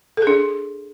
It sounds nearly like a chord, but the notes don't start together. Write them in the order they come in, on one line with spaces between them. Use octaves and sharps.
A4 G#4 D4